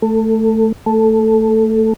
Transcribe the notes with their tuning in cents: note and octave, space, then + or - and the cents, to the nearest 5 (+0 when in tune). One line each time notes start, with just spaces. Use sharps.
A3 +0 A4 +25
A3 +15 A4 +0